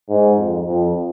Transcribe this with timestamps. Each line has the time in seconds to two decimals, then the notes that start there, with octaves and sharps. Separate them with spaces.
0.09 G#2
0.37 F2
0.66 F2